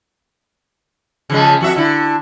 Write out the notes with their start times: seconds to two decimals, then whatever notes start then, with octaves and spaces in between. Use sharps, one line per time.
1.30 C#3 F3 G#3
1.61 F2 F#4 E5
1.76 D3 E4